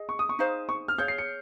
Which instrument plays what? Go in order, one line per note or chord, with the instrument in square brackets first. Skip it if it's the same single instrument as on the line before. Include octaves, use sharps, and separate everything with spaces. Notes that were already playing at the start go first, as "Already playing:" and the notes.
Already playing: [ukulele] G#4 D#5
[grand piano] C#6
D#6
C#6
[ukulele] D#4 G#4 C5 F5
[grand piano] C#6
F6
[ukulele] G#4 C#5 F5 [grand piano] G6
[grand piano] C7
C#7